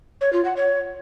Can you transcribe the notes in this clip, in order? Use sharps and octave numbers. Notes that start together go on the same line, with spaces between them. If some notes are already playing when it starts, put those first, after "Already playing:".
C#5
F4
F#5
C#5